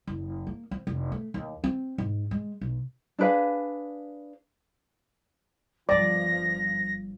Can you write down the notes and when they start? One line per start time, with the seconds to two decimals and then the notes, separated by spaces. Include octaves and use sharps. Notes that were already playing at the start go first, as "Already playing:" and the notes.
0.07 F#1
0.47 A#3
0.71 C4
0.87 F1
1.12 A3
1.34 D#2
1.64 C4
1.98 G#2
2.31 G#3
2.61 B1
3.19 D4 G#4 B4 F5
5.89 G1 G2 F3 D5 A#6